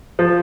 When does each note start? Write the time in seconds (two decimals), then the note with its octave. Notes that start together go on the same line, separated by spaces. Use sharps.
0.19 F3